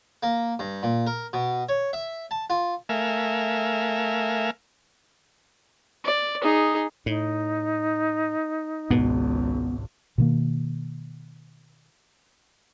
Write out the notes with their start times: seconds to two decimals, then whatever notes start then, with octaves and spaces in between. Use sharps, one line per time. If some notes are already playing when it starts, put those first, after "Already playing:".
0.23 A#3
0.59 G2
0.83 A#2
1.07 A#4
1.33 B2
1.69 C#5
1.93 E5
2.31 A5
2.50 F4
2.89 A3 A#4 E5 F5 G#5
6.04 D5
6.42 D#4 G#4
7.06 A2 D#4
8.90 G#1 C#2 G#2 B2 B3
10.18 B2 D#3 A#3